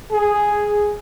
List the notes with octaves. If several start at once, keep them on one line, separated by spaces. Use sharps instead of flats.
G#4